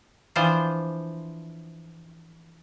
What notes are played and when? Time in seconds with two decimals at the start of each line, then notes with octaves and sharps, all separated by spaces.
0.36 E3 F3 D4 F4 C5